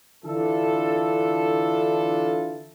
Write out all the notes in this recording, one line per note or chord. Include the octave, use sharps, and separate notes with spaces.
D3 E3 D4 E4 F4 A4